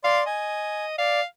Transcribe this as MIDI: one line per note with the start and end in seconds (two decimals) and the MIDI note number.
0.04 0.24 74
0.04 0.20 77
0.04 0.24 84
0.26 0.97 75
0.26 0.85 80
0.98 1.20 74
0.98 1.24 77